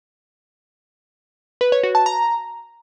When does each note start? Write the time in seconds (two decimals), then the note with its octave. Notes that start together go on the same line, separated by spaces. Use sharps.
1.61 B4
1.72 C#5
1.83 F#4
1.95 A5
2.06 A#5